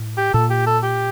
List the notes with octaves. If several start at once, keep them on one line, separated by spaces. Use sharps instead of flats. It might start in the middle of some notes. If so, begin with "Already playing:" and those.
Already playing: A2
G4
A#2 A4
G4
A4
G4